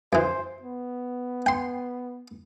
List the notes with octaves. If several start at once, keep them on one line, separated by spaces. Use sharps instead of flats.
F#2 E3 C5
B3
G5 C6